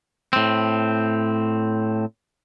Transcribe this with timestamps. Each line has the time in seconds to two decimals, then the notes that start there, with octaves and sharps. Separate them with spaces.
0.33 A2 C4